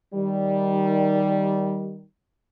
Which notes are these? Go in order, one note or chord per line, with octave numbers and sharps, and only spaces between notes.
D#3 G3